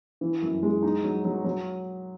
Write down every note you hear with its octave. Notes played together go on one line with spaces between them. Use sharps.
E3
F#2
G#3
D#4
F#3
F#3
F#3